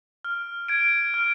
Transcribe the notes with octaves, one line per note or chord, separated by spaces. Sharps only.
F6
G#6 D7
F6